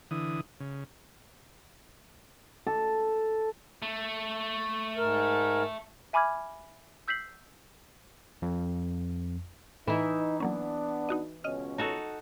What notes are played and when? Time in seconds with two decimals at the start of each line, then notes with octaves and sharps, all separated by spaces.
0.11 D3 E3 D#6
0.60 C#3
2.67 A4
3.82 A3
4.97 G#2 A#4
6.13 E5 G#5 B5 D6 F6 G#6
7.08 E6 G6 B6 C7 F#7
8.42 F2
9.87 A2 E3 D#4 E4
10.40 F#3 A#3 B3 C#4 D4
11.09 D#4 F#4 D#5
11.44 C#2 B2 C#4 D#5 F6
11.78 D#4 F#4 A4